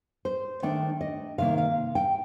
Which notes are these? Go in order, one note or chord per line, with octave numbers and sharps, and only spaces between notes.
C5
D#3 A3 D4 G5
D#5
C3 D#3 A#3 F5
F5
G5